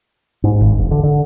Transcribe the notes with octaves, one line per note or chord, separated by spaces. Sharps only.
G#2
G#1
E1
D3
D3